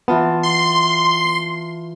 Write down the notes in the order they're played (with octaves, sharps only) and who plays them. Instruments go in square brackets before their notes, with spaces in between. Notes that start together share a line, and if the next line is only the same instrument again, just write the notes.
[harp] E3 F4 A5 [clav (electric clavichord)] B3
[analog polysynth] C6